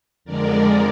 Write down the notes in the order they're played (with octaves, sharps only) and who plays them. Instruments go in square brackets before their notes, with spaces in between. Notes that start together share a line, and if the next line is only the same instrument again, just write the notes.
[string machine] F2 D3 G#3 A#4 D5